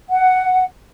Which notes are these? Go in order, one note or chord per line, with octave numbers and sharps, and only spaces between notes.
F#5